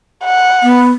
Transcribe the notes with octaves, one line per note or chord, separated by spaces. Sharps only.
F#5
B3